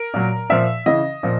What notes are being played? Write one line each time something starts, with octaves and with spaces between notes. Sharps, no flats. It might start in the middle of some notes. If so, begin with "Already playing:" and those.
Already playing: A#4
A#2 F#3
A#2 F3 E5
C#3 E3 D#5
A#2 F3